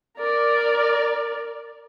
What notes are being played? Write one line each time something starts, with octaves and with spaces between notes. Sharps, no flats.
A#4 D5